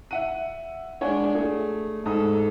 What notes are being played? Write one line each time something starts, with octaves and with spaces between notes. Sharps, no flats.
E5 F#5 D#7
G#3 D4 C#5 F#5 G#5
A3 G#4
G#2 A4 D#6